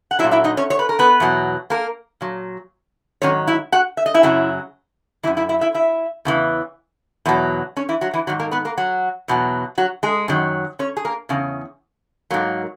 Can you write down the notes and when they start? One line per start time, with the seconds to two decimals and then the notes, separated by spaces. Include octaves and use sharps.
0.11 F#5
0.19 F#3 E4 E5
0.24 A#2
0.31 E4 E5
0.44 D#4 D#5
0.57 C#4 C#5
0.70 C#5
0.79 B4
0.89 A#4
0.99 B3 B4
1.20 E2 B2 F#3
1.70 A#3 A#4
2.21 A#2 F#3
3.22 G#2 D#3 F#3 C#4 C#5
3.47 E4 E5
3.72 F#4 F#5
3.97 E5
4.06 D#5
4.14 E4 E5
4.23 F#2 C#3 F#3
5.23 E3 E4 E5
5.27 F#2
5.37 E4 E5
5.49 E4 E5
5.61 E4 E5
5.74 E4 E5
6.25 E2 C#3 E3
7.26 E2 B2 F#3
7.77 C#4 C#5
7.89 E3 E4
8.01 F#3 F#4
8.14 E3 E4
8.27 G#2 D#3 F#3 F#4
8.39 A#3 A#4
8.51 B3 B4
8.65 A#3 A#4
8.77 F#3 F#4
9.28 E2 B2 F#3
9.78 F#3 F#4
10.03 G#3 G#4
10.28 F#2 D#3 F#3
10.79 C#4 C#5
10.97 G#4
11.05 A#3 A#4
11.29 E2 C#3 C#4
12.30 G#2 F#3 A#3